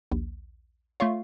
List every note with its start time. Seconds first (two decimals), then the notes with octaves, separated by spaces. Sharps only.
0.12 A#1 D#2
1.00 A3 F4 C#5 F5 C6 C#6